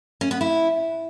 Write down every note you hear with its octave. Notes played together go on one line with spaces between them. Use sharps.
C#4
B3
E4